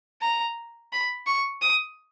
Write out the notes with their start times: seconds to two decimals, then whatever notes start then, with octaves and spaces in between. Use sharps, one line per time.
0.22 A#5
0.93 B5
1.27 C#6
1.61 D#6